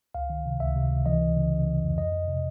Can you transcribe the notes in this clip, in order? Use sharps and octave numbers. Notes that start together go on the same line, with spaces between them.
C#2 F5
D#3
C3
C#2 E5
C3
C#2
E3 D#5
E3
C#3
C#3
E3
F2
F2 D#5
F2
C3